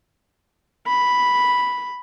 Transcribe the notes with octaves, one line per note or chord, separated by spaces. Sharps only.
B5